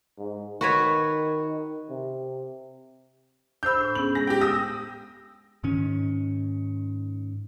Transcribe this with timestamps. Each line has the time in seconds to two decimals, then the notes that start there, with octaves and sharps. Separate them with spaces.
0.18 G#2
0.61 D#3 F#4 B4 C#5
1.90 C3
3.63 D4 C5 B5 E6 G6
3.81 A2
3.95 B3 C#4 G#4 F#7
4.15 G#3 A#6
4.27 G4 G5
4.41 D#6 E6 A#6
5.64 G#2 D#3 C#4